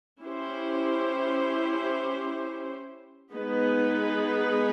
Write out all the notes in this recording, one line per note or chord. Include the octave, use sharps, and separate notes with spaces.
C#4 E4 G4 C5
G#3 B3 D#4 G#4 B4